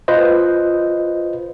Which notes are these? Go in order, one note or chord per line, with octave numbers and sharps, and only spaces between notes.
F4 B4 C5 D#5